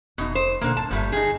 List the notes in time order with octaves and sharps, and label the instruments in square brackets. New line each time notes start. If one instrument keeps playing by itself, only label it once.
[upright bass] F1 [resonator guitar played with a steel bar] B2 D#4
[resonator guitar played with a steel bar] C5
[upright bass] B2 D#4 [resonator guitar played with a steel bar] D3 A#3
[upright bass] D1 G2 [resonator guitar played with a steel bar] A5
[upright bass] G1 [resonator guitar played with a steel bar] A#2 G3 A3
[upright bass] D3 [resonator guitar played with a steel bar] D#4 G#4